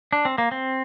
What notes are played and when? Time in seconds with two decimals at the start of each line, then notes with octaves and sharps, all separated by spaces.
0.13 D4
0.25 C4
0.38 A#3
0.51 C4